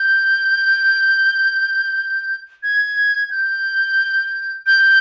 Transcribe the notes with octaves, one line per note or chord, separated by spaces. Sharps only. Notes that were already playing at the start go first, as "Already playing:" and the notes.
Already playing: G6
G#6
G6
G6